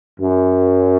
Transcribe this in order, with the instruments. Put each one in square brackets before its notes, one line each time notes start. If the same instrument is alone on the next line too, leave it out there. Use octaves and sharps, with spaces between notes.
[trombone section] F#2